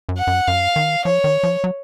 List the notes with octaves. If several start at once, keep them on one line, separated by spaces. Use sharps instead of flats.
F#2
F#5
F#2
F#2 F5
D#3
F3 C#5
D#3
F3
F#3